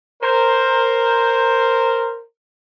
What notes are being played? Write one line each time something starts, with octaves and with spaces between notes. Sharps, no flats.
A#4 C5